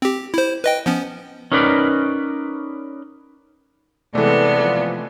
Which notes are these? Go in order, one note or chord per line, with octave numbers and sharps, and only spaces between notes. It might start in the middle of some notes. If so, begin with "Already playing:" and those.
C4 G4
E4 C5
B4 D#5 G5
F3 B3 C#4
C#4 D#4 A#4 B4 D5
C3 E3 G#3 A3 B3 A4 D5
F3